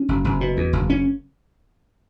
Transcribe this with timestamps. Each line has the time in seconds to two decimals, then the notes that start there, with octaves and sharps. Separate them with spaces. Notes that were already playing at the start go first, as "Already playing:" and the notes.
Already playing: C#4
0.09 F#1
0.24 F#1
0.41 B2
0.57 E2
0.73 F#1
0.90 C#4